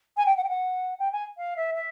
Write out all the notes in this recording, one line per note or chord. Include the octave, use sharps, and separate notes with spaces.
G#5
G5
F#5
G5
F#5
G5
G#5
F5
E5
E5